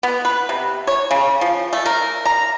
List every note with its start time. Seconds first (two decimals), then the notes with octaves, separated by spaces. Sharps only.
0.03 B3
0.25 B4
0.49 C3
0.87 C#5
1.11 C#3
1.41 F3
1.73 A3
1.86 A#4
2.25 A#5